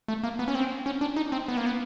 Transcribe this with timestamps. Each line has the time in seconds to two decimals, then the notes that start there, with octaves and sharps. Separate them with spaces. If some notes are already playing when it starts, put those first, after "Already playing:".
0.08 A3
0.23 A#3
0.39 B3
0.48 C#4
0.55 C4
0.86 C#4
1.01 D4
1.16 D#4
1.32 C4
1.48 B3
1.57 A#3
1.66 B3